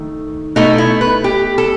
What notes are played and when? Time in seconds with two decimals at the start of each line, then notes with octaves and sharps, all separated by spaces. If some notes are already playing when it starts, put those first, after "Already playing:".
Already playing: D#3 A3
0.56 B2 A3 D#4
0.78 E4
1.01 B4
1.24 G4
1.58 A4